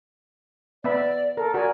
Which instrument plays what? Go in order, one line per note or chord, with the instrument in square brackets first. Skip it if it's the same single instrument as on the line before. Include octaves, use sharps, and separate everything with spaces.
[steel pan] B3 E5 B5 [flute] D5
[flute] A4 [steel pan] A#4
[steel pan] F#4 A#4 G#5 [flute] D5